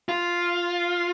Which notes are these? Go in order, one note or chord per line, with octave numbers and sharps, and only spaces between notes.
F4